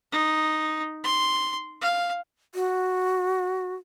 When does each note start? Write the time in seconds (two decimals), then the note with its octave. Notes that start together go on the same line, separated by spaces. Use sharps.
0.12 D#4
1.04 C6
1.81 F5
2.55 F#4